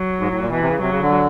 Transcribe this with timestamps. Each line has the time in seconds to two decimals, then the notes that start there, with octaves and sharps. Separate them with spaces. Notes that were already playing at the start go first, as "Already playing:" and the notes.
Already playing: F#3
0.20 G#2
0.31 A2
0.41 A#2
0.50 B2 E3
0.61 C3
0.70 C#3
0.81 C3 F#3
0.91 C#3
1.01 D3